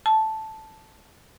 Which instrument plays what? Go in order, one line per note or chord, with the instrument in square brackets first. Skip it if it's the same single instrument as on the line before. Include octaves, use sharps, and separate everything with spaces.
[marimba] A5